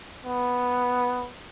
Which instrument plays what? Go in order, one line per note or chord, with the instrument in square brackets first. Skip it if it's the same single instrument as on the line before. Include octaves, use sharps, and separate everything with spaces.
[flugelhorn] B3